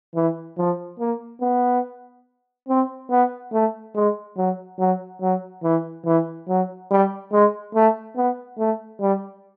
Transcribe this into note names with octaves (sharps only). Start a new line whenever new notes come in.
E3
F3
A#3
B3
C4
B3
A3
G#3
F#3
F#3
F#3
E3
E3
F#3
G3
G#3
A3
B3
A3
G3